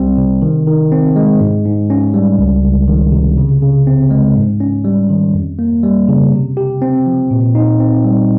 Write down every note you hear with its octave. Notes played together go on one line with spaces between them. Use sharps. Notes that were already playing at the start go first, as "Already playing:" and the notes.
Already playing: C2 G3 C4
C3
D#3
D#3
C4
G#3
G#2
G#2
C#4
G3
C#2
C#2
D#3
C3
C#3
C#3
C4
G#3
G#2
C#4
G3
D#3
F2
A#3
G3
C#3
C3
G4
C4
F3
A#2
D#4
C4
G3